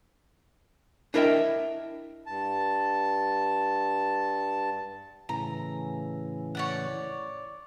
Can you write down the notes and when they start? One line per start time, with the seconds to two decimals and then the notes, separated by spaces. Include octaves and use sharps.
1.14 D4 E4 A#4 D#5 E5 G5
2.26 G2 A5
5.29 A2 C#3 E3 A#5
6.55 C#5 D5 F#5